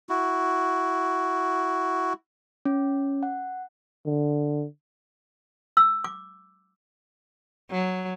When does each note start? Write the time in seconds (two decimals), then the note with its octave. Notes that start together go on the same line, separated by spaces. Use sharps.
0.09 E4 F#4
2.65 C#4
3.23 F#5
4.06 D3
5.77 E6
6.04 D6
7.71 F#3